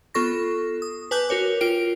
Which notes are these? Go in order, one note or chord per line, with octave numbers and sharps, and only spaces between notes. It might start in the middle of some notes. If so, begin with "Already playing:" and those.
B3 F4 A4 C#6 A#6
D#6
B4 G#5 A5 D6 F#6 G6
F#4 A#4 C#5 D6
F4 A#4 G5 D7